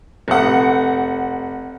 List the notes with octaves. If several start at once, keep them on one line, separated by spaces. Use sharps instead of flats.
F1 F#5